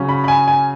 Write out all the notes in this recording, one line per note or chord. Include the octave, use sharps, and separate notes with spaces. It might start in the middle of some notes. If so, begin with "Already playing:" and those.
Already playing: C#3 F#3 C#4
B5
B5
G#5
G#5